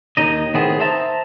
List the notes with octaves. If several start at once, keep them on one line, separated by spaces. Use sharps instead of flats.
D#2 D#4 D#5
A2 D#3 B3 C4 G#4
C5 E5 A5 A#5